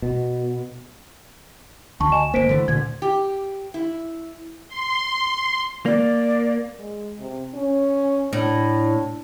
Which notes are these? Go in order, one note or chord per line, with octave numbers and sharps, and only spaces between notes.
B2
D2 A5 C#6
D#5 G#5 E7
G1 A#3 C5 B6 D7
D3 E3 A3 C5
D2 A#2 D3 G#6
G4
E4
C6
A#3 D5
G#3
C3
C#4
A2 D4